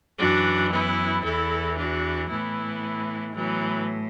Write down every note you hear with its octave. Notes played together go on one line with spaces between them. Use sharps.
F#2 E3 D4 F#4
B3 E4
E2 E3 E4 A4
D4 F#4
A2 E3 B3 E4
A2 E3 F#3 B3